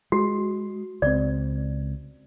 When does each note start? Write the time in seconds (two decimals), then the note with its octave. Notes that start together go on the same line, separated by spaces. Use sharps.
0.12 G#3 F#4
1.02 C#2 C4 D5